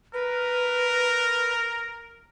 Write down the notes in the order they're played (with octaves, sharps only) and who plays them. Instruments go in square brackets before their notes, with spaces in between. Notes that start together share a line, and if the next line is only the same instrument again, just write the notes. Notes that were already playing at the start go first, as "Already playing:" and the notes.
[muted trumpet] A#4 [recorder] B4